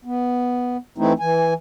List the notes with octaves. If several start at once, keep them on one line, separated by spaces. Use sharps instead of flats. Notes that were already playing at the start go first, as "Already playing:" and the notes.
B3
E3 A3 C4 D#4 E4
E3 G#5